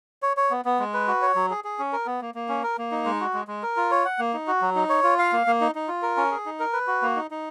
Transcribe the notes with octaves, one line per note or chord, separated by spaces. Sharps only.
C#5
C#5
B3
B3
G#3
B4
F#4
C#5
F#3
G#4
G#4
C#4
A#4
B3
A#3
A#3
C#4
A#4
A#3
D#4
G#3
F#4
G#3
G#3
A#4
F4
C#5
F#5
A#3
D#4
F#4
F#3
D#4
C#5
F4
F5
A#3
A#3
D#4
D#4
F4
A#4
C#4
G#4
D#4
A#4
B4
F#4
A#3
D#4
D#4